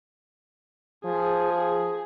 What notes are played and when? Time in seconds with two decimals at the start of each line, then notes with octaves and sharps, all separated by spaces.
1.05 F3 G#4
1.52 G#4